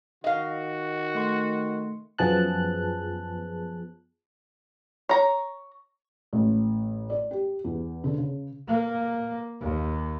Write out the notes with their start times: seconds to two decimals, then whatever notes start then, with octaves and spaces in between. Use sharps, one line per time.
0.24 D#3 F#4 D#5 F5
1.15 A3 C6 C#7
2.18 F#2 F3 B3 G#4 A5 F#6
5.09 C#5 A#5
6.33 A1
7.10 D5
7.31 G4
7.64 E2
8.04 D3
8.18 C#3
8.68 A#3
9.61 D#2